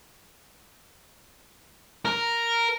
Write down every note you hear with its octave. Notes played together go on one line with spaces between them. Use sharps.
A#4